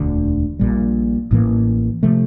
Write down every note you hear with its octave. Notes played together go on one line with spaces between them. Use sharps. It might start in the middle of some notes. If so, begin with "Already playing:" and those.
Already playing: E1 D2 D3
A#1 A#2 G3
A1 A2 E3 A#3
C3 F3 A3